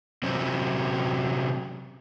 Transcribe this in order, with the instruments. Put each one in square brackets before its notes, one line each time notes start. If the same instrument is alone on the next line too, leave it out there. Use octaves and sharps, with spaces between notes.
[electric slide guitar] C3 F#3 C4 C#4